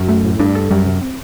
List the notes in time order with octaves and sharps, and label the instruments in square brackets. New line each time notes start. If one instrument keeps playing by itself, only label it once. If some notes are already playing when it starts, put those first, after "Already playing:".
Already playing: [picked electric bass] F#2 [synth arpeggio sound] F#4
[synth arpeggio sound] A3
A2
[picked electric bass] G2 [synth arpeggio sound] D4
[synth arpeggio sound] A4
[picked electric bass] F#2 [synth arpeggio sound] G3
[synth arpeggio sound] C3
C4